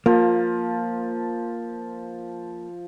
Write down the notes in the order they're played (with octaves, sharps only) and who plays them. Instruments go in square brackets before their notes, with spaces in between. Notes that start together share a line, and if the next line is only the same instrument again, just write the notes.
[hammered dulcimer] F3 [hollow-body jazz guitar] A#3